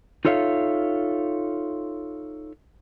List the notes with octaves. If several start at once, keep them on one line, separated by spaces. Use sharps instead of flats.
D#4 F4 A4 C#5 E5 F5